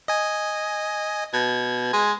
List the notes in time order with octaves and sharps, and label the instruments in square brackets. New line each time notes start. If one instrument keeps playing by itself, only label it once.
[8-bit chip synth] D#5 G#5
[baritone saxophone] B2 [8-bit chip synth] G#6
[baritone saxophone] G#3